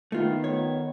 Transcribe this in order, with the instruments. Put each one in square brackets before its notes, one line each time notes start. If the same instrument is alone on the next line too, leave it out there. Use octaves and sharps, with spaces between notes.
[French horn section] D#3 B3 [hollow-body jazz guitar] A3 F4
[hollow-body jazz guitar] C#5